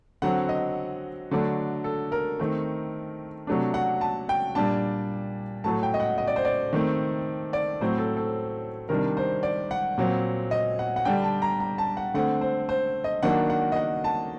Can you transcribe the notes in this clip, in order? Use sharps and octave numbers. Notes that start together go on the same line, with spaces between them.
D3 F#3 C4 F#5
D#5
D3 F#3 A3 D4
A4
A#4
D#3 A3 C4
C3 F#3 A3 D4
F#5
A5
G5
A#2 G3 D4 A5
A2 F#3 A3 A5
G5
D#5
F#5
D#5
D5
C5
D5
D#3 A3 C4
D5
A2 F#3 A3 C4 C5
A4
A4
C3 D#3 G3 D4 A#4
C5
D5
F#5
A#2 F#3 C4
D#5
F#5
F#5
D3 G3 D4 G5
A5
A#5
A#5
A5
F#5
D3 A3 C4 F#5
C5
C5
D#5
D#3 F#3 A#3 D4 F#5
F#5
D#5
F#5
A5